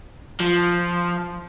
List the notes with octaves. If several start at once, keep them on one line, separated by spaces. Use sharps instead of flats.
F3